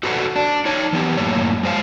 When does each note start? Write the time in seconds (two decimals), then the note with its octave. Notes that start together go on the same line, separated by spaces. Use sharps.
0.03 F#4 A4 B4 C5 E5 F#5
0.36 D4
0.65 D#4 C#5
0.93 E3 B3 G4
1.17 F#2 A2 A#3 C#5
1.63 G#3 C5 F5